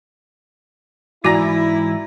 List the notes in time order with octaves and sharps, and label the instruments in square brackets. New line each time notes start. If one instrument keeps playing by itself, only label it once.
[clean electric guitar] G#2 E3 G#5 [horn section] E4 [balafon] F#4 [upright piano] D5 A#5 A#6